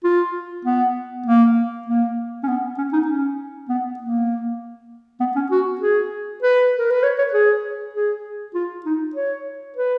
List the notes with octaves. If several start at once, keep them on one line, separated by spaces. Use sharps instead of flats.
F4
B3
A#3
A#3
C#4
B3
C#4
D#4
C#4
B3
A#3
B3
C#4
F#4
G#4
B4
A#4
B4
C#5
C#5
G#4
G#4
F4
D#4
C#5
B4